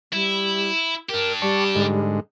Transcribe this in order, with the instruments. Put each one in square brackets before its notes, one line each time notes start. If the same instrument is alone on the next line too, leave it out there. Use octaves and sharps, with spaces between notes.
[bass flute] G3 [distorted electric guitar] E4
[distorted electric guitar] D4 G4 [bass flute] A#4
[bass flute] G3 [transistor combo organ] D5 A5 C#6
[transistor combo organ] G#2 D3 G#3